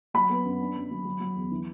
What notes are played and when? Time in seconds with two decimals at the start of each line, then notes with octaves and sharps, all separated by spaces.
0.14 F#3 B5
0.29 B3
0.45 F#2
0.60 D4
0.76 F#2
0.91 F#3
1.05 F#3
1.20 F#3
1.36 E2
1.51 E3